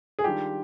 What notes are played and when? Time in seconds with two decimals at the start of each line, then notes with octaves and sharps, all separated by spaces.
0.19 G#4
0.24 D#3 G3 D4 F4 G4